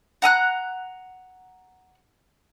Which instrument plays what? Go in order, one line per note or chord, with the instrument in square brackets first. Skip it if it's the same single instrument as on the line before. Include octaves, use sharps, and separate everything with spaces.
[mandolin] F#5 A#5 D#6 F#6